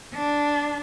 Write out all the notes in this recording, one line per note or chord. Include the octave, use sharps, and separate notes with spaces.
D4